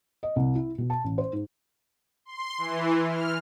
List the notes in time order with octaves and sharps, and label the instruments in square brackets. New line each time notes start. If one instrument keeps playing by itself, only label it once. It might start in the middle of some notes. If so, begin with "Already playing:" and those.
[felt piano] D#5
C2
E4
B2
A5
A1
C5
G#2
[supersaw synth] C6
E3
F6